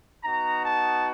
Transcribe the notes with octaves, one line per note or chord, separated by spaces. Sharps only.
B3 D#4 F#4 A#5
A5